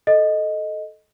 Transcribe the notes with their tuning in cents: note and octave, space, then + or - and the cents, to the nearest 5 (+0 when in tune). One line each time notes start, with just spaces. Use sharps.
A4 -10 D#5 +0